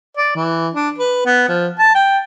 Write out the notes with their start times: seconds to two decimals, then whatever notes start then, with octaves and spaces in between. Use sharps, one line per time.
0.18 D5
0.36 E3
0.74 D4
0.98 B4
1.25 B3
1.48 F3
1.79 A5
1.95 G5